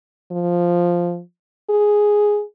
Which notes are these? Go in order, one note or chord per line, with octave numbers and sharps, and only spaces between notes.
F3
G#4